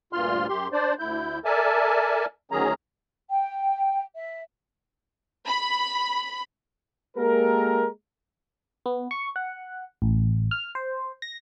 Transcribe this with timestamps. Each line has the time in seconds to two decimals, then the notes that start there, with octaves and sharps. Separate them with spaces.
0.13 D2 G2 A#2 F4 C6 F6
0.49 F#2 G4 C6
0.73 D4 C5 D5
0.99 D2 E4 G6
1.45 A4 A#4 D5 E5 G#5 A5
2.52 D2 D#3 F#3 C#4 G#4 A#5
3.30 G5
4.15 E5
5.46 B5
7.17 G#3 A#3 G4 A4 A#4
8.86 B3
9.11 C#6
9.36 F#5
10.02 A1
10.51 F6
10.75 C5
11.22 A#6